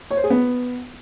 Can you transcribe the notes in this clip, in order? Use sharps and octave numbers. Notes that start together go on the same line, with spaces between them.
C#5
C5
G#4
B3